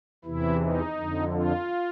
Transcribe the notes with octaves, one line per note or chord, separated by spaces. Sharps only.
E2 C3 E3 E4
D#4
F2 D3
F4